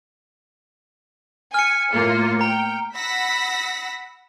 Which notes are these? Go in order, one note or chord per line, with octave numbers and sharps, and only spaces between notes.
G#5 F6 C#7
A2 A#3 F4
G5 A#5
F#5 B5 E6 A#6 B6